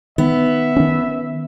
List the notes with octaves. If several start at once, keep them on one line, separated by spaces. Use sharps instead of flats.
D#3 B3 E5
D#3 C#4